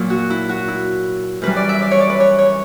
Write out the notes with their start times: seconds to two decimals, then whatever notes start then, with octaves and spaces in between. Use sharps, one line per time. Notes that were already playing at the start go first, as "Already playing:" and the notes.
Already playing: A#2 F#3
0.10 F#4
0.30 E4
0.49 F#4
0.68 E4
1.42 F#2 E3 G3 B4
1.56 D5
1.69 E5
1.82 D5
1.91 C#5
2.01 D5
2.10 B4
2.20 C#5
2.38 C#5